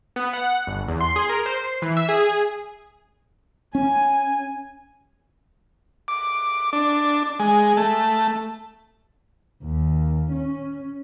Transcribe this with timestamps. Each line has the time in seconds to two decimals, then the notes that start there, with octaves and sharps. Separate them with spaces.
0.16 B3
0.33 F#5
0.67 G1
0.88 E2
1.01 C6
1.16 G#4
1.29 A#4
1.46 C5
1.64 C7
1.82 E3
1.97 E5
2.09 G#4
3.75 C#4 G#5
6.08 D6
6.73 D4
7.40 G#3
7.77 A3
9.64 D#2
10.32 C#4